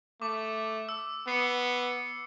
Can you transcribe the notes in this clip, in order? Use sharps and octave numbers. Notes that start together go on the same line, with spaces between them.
A3 D6
E6
B3 C7 C#7